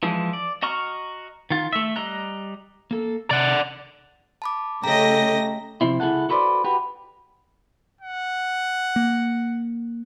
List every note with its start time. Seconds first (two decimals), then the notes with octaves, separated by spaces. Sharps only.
0.03 E3 F3 G#3
0.33 D5
0.62 F#4 D#5 A#5 C#6 F6
1.50 D#3 F4
1.73 A3 E5
1.96 G3 D#5 A#5 F#6
2.91 A#3 A4
3.31 C3 D5 F#5
4.42 A5 B5 D6
4.84 C#3 A3 G4 D#5 A#5 A#6
5.81 C3 F3 C4 E4
6.00 C#2 E4 F4 G#4 A4 F#5
6.29 F#4 A4 B4 C5 D5
6.65 F#4 G4 B4
8.01 F#5
8.96 A#3